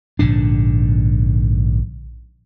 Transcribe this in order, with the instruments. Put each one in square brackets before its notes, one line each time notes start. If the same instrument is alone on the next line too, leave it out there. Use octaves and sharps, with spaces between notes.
[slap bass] A#1 G#2 D3 D4